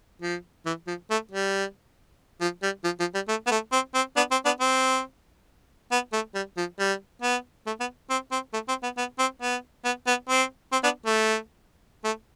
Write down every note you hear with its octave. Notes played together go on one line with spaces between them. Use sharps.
F3
E3
F3
A3
G3
F3
G3
F3
F3
G3
A3
B3
A3
C4
C4
B3 D4
C4
B3 D4
C4
B3
A3
G3
F3
G3
B3
A3
B3
C4
C4
A3
C4
B3
B3
C4
B3
B3
B3
C4
C4
B3 D4
A3
A3